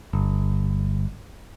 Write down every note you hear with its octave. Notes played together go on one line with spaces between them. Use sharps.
G1